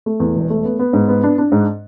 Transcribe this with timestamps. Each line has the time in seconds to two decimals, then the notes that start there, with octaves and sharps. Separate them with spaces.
0.06 A3
0.20 E2
0.36 E1
0.50 A3
0.65 B3
0.79 B3
0.93 G#2
1.08 B3
1.23 D4
1.38 D4
1.52 G#2